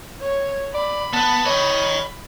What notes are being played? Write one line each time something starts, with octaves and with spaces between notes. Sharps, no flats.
C#5
D5 B5
B3 B4 A5
C#5 D#5 G5